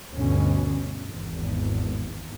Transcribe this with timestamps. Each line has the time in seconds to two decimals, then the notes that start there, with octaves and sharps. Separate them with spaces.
0.13 D2 G2 B2 D3 C#4
1.04 G#1 E2